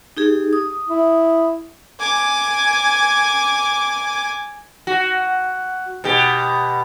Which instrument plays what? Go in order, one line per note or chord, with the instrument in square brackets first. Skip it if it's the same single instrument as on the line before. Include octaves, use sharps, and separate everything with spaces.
[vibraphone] D#4 G4 G#4
D#6
[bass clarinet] E4
[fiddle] G#5 D6
[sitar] F#4
B2 G4